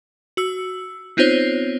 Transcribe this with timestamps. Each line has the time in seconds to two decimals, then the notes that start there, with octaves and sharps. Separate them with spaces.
0.37 F#4 E6
1.17 B3 C4 D#4 F4 C5 C#5